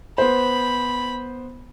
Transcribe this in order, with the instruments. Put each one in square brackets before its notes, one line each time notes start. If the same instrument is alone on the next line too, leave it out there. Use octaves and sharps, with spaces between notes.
[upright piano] B3 C5 [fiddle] B5